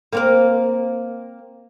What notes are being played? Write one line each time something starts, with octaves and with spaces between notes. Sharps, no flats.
A#3 C4 A#4